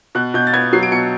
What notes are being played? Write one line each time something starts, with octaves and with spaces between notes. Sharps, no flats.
B2 F#6
B2 G6
A6
B3 G#6
F#3 C7
D7
B2 C#7